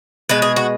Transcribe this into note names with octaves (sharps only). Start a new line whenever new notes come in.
B2 G#3 B4
G#4
F#4